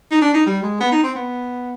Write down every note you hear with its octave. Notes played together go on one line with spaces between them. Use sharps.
D#4
D4
D#4
G3
G#3
B3
D#4
C4
B3